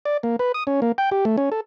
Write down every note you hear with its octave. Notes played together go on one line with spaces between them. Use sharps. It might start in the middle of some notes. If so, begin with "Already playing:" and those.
D5
A#3
B4
D#6
C#4
A#3
G5
G4
A3
C#4
A4